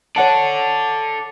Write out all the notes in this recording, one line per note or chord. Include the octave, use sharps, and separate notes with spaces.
A4 C#5 D5 F#5 A5